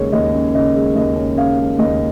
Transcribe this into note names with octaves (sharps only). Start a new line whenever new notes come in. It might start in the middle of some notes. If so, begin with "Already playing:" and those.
Already playing: D#2 C#3 G#3 C#4 C#5
D#2 D#5
C#4
C#3 D#5
G#3
D#2 D#5
C#4
C#3 F5
G#3
D#2 D#5